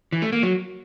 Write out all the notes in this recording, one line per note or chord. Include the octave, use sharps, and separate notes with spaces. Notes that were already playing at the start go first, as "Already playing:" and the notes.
E3
A3
A#3
F#3